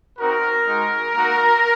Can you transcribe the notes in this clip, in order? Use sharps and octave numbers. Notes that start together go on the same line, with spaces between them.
C4 D#4 F#4 A#4
G#3 D#4 F#4
A#3 D#4 F#4